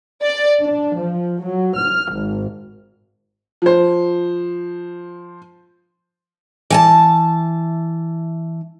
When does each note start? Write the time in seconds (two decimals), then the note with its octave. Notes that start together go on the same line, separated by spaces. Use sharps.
0.22 D5
0.63 D4
0.97 F3
1.42 F#3
1.78 F6
2.11 G#1
3.62 F3 C5
6.70 E3 G#5 A5